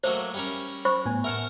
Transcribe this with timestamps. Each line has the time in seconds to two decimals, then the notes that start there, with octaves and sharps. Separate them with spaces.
0.04 F#3 A3 A#3 C5
0.34 G3 C#4 A#4
0.85 C5 B5 C#6
1.05 A2 B3 G#5
1.24 A#4 E5 F#5 A5 F6